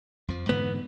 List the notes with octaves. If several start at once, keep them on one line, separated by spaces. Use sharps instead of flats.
F2 F3
G#2 D3 E3 B3